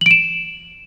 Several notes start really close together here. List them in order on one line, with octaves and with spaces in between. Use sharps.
F#7 D7 E7